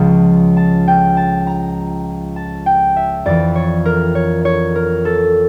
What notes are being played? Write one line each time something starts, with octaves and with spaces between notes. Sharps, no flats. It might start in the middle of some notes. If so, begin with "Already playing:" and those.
Already playing: C#2 C#3 F3 A5
A5
G5
A5
A#5
A5
G5
E5
F2 E3 D5
C#5
A#4
C#5
C#5
A#4
A4